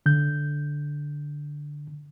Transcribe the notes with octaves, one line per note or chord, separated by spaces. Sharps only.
D3 G6